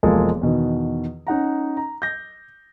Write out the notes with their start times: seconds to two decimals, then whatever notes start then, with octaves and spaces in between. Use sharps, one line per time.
0.03 E1 F3 G#3 A#3 G#4 A4
0.41 E2 B2 D#3
1.27 C#4 D#4 F#5 A#5
1.77 A#5
2.02 G6 A#6